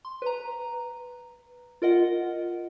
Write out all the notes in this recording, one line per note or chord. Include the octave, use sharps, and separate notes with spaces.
C6
B4 A#5
F4 A#4 D#5 F#5